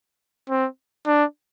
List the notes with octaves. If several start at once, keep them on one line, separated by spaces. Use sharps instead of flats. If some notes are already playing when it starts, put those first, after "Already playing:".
C4
D4